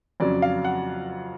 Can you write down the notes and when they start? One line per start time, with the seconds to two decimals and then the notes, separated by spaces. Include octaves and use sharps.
0.20 F2 C#3 F#3 D5
0.42 F5
0.65 F#5